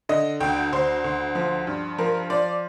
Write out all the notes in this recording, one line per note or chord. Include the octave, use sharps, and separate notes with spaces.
D3 D#5
D2 G5
D2 C5
D2
F3
G2
F3 A#4
F3 D5